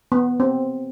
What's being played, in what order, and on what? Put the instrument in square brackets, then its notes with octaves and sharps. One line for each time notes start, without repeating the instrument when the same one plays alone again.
[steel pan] B3
C4